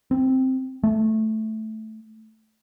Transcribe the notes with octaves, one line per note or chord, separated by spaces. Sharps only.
C4
A3